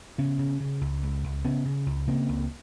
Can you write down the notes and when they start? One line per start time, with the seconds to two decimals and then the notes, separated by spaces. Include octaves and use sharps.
0.18 C#3 B3 C#4
0.39 C#3
0.60 C#3
0.81 C#2
1.03 C#2
1.23 C#2
1.44 C#3 B3 C#4
1.65 C#3
1.86 C#2
2.07 C#3 A#3 C4
2.29 C#2